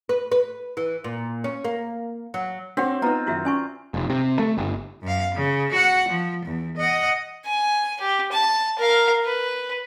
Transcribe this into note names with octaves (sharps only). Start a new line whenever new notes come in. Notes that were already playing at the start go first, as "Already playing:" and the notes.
B4
B4
E3
A#2
C#4
A#3
F#3
C4 D4 F#4 C5 C#5 F#5
B3 D#4 F4 B4 A#5
F#2 D#3 E4 F#4 E5
C#4 D5 G#5 A#5 C#6
F1
C3
A3
G1
F#2 F5
C#3
F#4 F#5
F3
E2
D#5 F#5
G#5
G4
A5
A#4 F5
B4